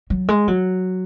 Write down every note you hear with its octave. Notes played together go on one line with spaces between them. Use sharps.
F#3
G#3
F#3